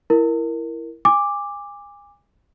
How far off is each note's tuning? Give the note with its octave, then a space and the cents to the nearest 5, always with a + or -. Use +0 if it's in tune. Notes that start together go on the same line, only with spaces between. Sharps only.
E4 +10 A#4 +0
G#5 -30 D6 +0